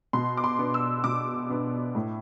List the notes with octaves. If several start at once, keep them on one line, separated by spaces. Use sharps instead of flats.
B2 C6
D6
C6
B3 D4
E6
B2 D6
B3 D4
A2